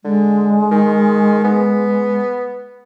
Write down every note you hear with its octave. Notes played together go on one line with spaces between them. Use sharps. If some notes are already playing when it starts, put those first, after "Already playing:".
D3 G#3
D#3
B3